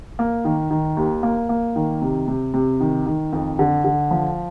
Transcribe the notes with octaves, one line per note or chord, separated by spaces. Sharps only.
A#3
D#3
D#3
D#2
A#3
A#3
D#3
C3
C3
C3
D#3
D#3
F2
D3
D3
F3